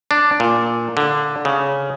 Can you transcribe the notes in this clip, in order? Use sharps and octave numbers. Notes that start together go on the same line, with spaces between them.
D4
A#2
D3
C#3